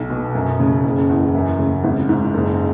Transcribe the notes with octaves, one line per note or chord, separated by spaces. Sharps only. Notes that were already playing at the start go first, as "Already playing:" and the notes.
Already playing: B1
B2
F#2
C#3
F#1
E2
F#2
C#3
G#1
G#2
F#1